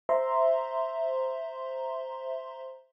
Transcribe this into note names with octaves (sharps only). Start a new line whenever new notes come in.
C5 E5 A#5 C6